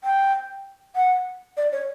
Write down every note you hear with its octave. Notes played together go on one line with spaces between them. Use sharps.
G5
F#5
D5
C#5